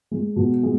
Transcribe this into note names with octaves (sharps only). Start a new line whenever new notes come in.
G#3
B2
G#3